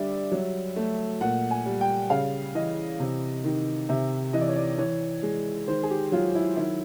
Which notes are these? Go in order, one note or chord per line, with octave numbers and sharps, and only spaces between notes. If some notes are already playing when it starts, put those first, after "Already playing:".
Already playing: D3 G3 D5 E5
F#3
A3
A#2 F#5
G#5
G3
G5
C#3 F5
E3 D#5
C3
D#3
C3 E5
E3 D#5
D5
C#5
D5
E3 C#5
G#3
D#3 C5
G#4
G4
F#3 F4
E4
D#3 E4